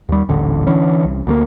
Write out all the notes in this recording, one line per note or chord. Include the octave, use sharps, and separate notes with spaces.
D#2 G3
D#1 A1 D3
D3 E3 C#4
C2
D2 G3 A#3